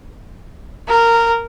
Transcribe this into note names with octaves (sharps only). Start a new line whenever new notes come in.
A#4